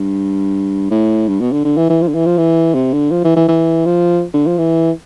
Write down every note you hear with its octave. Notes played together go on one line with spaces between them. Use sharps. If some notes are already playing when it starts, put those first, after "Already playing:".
Already playing: G2
A2
G2
B2
D3
D3
E3
E3
F3
D3
E3
F3
E3
C3
D3
F3
E3
E3
E3
F3
D3
F3
E3